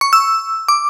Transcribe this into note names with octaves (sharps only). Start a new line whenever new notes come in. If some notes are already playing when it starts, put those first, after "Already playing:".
C#6
E6
D6